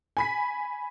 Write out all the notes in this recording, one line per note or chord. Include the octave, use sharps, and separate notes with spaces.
G#5 B5 B6